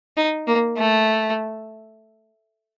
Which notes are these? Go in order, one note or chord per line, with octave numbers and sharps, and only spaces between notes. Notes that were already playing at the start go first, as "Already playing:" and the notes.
D#4
A#3
A3